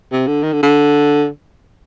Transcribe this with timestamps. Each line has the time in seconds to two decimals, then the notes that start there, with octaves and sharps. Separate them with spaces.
0.12 C3
0.27 D3
0.43 D#3
0.53 D3
0.63 D3